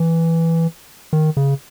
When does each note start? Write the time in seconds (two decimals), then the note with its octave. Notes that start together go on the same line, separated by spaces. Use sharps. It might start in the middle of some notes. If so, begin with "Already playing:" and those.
Already playing: E3
1.13 D#3
1.37 C#3